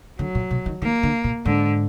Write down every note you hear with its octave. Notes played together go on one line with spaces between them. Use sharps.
D3 F#3
A#2
B2
D#3
D#3 A#3
D3
A#2
G#2 D3